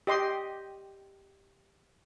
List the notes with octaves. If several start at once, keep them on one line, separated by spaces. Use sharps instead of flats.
G4 D#5 C6